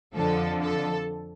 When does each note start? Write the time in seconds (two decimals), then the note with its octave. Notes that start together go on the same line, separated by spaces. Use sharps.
0.14 F2 D3 F3 A4
0.62 A4